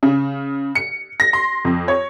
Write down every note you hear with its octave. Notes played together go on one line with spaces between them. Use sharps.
C#3
C#7
A#6
C6
F2
C#5